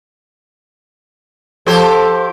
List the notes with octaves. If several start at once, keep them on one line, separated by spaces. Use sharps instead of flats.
F3 G4 A4 C5